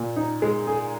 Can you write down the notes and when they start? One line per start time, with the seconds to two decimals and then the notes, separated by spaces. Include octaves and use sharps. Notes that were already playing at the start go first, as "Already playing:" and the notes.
Already playing: A#2
0.16 D#4
0.42 G#3
0.67 G#4